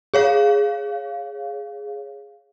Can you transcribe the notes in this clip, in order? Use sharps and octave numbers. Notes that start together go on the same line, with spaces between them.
G#4 C#5 F5